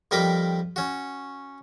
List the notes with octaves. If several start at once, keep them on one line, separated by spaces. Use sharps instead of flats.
F2 G3 A#4 D#5 B5 D6
C#4 F#4